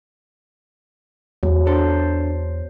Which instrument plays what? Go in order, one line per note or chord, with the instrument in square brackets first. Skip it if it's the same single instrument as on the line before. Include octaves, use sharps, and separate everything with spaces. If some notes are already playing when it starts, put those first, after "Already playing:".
[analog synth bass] E2 [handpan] F#3
[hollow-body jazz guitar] D4 A4 [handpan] C5